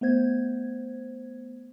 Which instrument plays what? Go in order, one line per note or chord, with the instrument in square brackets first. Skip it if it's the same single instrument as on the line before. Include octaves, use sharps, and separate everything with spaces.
[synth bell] A3 B3 C5 G#6